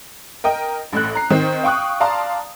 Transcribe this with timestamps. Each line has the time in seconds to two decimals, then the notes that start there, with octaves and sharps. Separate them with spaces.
0.44 A#4 D#5 G5
0.93 A1 A2 F#6
1.15 A#5 C7
1.30 D#3 C4
1.64 F5 G5 C#6 D#6 F#6
2.00 D5 F5 A5 A#5 C6